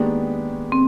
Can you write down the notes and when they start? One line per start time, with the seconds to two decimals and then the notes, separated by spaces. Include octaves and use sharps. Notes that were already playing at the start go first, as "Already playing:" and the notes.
Already playing: D#3 G#3 A#3 B3 D4 G4
0.72 C4